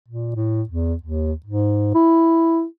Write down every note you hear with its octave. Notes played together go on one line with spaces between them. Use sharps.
A#2
A2
E2
D#2
G#2
E4